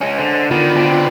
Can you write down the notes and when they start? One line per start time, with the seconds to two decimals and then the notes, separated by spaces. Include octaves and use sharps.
0.01 G#3 C#4
0.18 D3 C5
0.51 D3 D#3 B3 F4
0.76 B2 C4